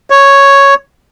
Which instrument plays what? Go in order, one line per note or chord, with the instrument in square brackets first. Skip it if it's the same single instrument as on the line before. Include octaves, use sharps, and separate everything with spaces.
[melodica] C#5